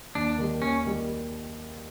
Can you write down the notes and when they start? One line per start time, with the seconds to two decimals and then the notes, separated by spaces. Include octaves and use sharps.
0.15 D#2 D4
0.38 D#3 G3
0.62 D#2 C#4
0.85 D#3 G3